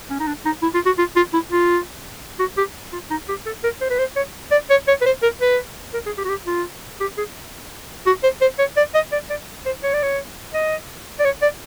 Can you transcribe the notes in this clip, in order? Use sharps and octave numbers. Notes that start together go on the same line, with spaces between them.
C#4
D#4
D4
D#4
E4
F4
F#4
F4
F4
E4
F4
F#4
G4
F4
D#4
G4
A4
A#4
C5
B4
C5
C#5
D5
C#5
C#5
B4
C5
A#4
B4
A#4
G#4
G4
F#4
G4
F4
G4
G#4
F#4
C5
C5
C#5
D5
D#5
D5
D5
C5
C#5
D5
C#5
D#5
D5
C#5
D5